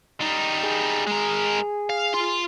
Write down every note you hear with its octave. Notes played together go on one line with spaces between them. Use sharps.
G3 D#4
G#4
G#3 A#4
F5
F4 C6